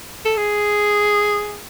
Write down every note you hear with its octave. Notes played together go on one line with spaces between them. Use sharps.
A4
G#4